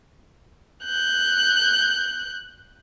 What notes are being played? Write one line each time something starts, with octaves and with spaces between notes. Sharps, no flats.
F#6 G6